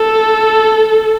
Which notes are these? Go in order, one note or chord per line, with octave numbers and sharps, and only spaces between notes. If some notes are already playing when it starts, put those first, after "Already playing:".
Already playing: A4